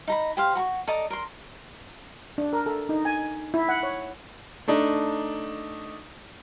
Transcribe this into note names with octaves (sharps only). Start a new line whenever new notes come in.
D#4 A#5 B5
G4 C5 F5
F#4 A#5 C#6
A4 D5 D#5 A#5
A#4 C6
D4
A#4
A4
D#4
G#5
E4
F#5
C#5
A3 D4 D#4